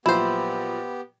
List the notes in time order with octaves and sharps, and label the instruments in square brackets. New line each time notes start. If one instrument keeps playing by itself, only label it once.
[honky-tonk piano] A#2 F3 F#3 [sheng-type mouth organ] B3 G4 [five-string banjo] E4 C5